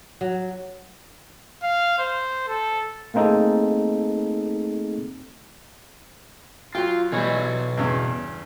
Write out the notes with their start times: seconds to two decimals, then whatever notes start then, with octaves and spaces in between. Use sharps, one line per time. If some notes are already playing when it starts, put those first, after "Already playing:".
0.21 F#3
1.63 F5
1.98 C5
2.48 A4
3.14 A3 A#3 C4 D#4 G#4 A4
6.75 F#3 F4 G5
7.12 B2 E3 G3 C#5
7.77 E2 G2 C#3